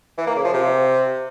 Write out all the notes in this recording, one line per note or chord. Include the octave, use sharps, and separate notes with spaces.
E3
A#3
C#3
F3
C3